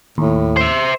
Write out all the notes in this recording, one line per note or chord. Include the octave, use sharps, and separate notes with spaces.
D#2 A2
C5 E5